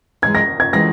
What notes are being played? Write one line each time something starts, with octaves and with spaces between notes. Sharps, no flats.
F#2 E3 G#3 G#6
A#6
G#6
E3 G#3 A#6